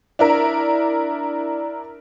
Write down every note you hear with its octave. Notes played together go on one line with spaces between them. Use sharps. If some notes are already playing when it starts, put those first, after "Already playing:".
D4 E4 A#4